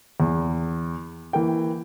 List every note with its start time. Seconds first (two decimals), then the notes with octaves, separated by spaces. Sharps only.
0.20 E2
1.33 E3 A#3 G5